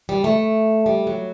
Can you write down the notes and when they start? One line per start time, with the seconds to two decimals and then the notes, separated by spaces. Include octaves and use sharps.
0.09 G3
0.24 A3
0.86 G3
1.07 F#3